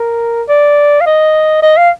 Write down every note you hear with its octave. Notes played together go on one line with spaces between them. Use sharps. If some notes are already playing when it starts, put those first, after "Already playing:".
Already playing: A#4
D5
F5
D#5
D#5
F5